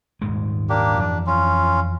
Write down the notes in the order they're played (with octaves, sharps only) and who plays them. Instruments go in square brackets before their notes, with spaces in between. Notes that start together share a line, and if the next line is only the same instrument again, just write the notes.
[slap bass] D#1 G#2 G#3
[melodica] A#3 D4 G4
[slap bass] F2 E3 [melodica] D4
[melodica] C#4 F4